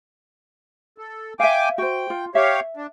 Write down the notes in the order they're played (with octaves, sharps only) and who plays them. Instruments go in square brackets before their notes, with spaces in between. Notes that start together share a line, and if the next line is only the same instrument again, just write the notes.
[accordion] A4
[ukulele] E5 F5 [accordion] G5 G#5 D6
[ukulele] F#4 C5 [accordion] G5
[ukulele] F4
[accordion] G4 C#5 F5 [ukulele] E5
[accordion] D4